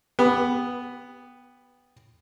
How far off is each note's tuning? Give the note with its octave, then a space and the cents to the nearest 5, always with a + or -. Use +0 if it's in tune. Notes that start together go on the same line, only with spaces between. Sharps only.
B3 +0 G4 +20